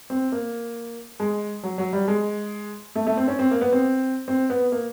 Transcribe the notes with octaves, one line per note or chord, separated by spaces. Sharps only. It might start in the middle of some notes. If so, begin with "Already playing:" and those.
C4
A#3
G#3
F#3
F#3
G3
G#3
A3
A3
C4
C#4
C4
A#3
B3
C4
C4
B3
A#3